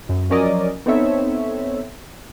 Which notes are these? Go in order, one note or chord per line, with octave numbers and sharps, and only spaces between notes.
F#2
F3 F#3 C#4 A#4 D5 D#5
B3 C4 D#4 A4 C#5 E5